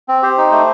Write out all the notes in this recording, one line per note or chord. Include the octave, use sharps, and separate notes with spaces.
C4
G4 C5
D#4
A3